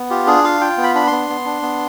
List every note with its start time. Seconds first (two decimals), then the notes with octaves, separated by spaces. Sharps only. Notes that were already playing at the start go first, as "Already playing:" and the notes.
Already playing: B3
0.10 F4 G4
0.27 D4 G#4
0.44 F4 F5
0.61 F4 G5
0.78 B3
0.83 B5
0.95 D4 B5
1.07 C6
1.12 B3
1.29 B3
1.46 D4
1.62 B3